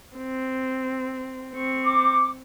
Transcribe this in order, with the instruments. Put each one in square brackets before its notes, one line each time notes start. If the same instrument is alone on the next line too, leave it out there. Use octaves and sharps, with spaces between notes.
[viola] C4
C4 C#6
[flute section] D6